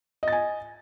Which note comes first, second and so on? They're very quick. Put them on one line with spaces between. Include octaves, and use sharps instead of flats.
D#5 A6 G#5